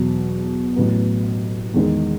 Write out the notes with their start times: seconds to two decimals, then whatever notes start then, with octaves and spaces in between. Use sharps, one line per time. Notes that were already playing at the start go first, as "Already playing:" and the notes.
Already playing: E2 B2 F#3
0.76 A1 A2 F#3 B3
1.74 E2 D#3 G#3 D#4